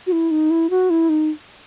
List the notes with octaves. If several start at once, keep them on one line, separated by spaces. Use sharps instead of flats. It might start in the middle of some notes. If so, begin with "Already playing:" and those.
F#4
E4
D#4
E4
F#4
E4
D#4